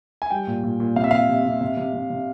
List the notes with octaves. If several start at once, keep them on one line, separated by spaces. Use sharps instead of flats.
G#5
G3 G5
A#2
A#2
A#2
C3 F5
E5
C3 F5
C3
C3
C3
C3
C3
C3